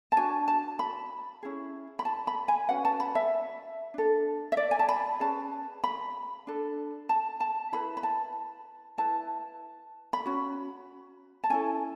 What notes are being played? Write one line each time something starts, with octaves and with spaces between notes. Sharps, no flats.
A5
D4 F#4 G#5
A5
B5
C#4 E4 G#4
B5
A5
B5
G#5
C#4 F#4 B4 F#5
A5
B5
E5
D4 A4
E5
D5
G#5
A5
B5
C#4 G#4 B4 A5
B5
D4 A4
A5
A5
E4 G#4 B4 B5
B5
A5
E4 B4 A5
B5
C#4 F#4
A5
C#4 E4 A4 G#5